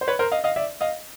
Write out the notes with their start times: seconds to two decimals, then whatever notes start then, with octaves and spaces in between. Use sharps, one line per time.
0.01 C5
0.08 B4 C#5
0.19 A#4 C5
0.32 D#5 F5
0.44 D#5 F5
0.56 D5 E5
0.81 D#5 F5